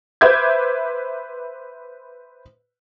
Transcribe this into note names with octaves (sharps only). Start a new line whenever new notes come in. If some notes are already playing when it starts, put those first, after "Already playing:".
B4 C5 E5 D6 G6 G#6